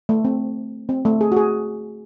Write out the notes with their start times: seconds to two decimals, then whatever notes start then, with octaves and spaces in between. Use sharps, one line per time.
0.09 A3
0.25 C4
0.89 C4
1.05 A3
1.21 G#4
1.32 F#4
1.37 G#4